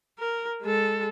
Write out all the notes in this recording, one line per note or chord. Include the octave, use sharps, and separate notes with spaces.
A#4
G#3 A4